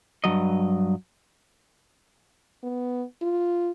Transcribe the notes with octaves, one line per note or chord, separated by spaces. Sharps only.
G2 C#3 F#3 D#5
B3
F4